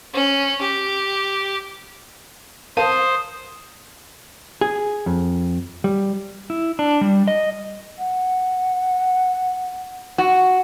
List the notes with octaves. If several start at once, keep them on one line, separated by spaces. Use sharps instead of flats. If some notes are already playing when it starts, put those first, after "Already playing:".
C#4
G4
A#4 C5 F5 A5 D#6
G#4
F2
G3
E4
D4
G3
D#5
F#5
F#4